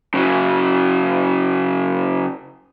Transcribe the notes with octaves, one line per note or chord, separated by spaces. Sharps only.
C#3 F#3